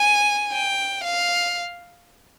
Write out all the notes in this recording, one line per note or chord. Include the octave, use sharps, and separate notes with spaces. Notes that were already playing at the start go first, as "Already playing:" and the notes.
Already playing: G#5
G5
F5